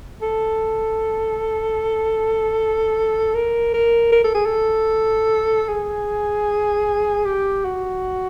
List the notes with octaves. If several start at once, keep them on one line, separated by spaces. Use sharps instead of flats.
A4
A#4
A#4
A#4
A4
G#4
A4
G#4
G4
F#4